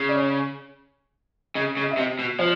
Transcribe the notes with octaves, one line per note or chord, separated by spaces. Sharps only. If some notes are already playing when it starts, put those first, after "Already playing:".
Already playing: C#3
D5
C#5
C#3 D#5
C#3
D#5
E5
C3 D#5
B2
F3 C5